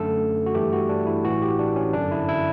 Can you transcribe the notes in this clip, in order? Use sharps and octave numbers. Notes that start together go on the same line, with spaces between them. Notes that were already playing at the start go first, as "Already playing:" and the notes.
Already playing: F#2 D3 A3 A4
F#4
G2 E3 A3 G4
F#4
D4
E4
A1 A2 E3 F#4
G4
D4
C#4
G1 F#2 D3 D4
E4
E4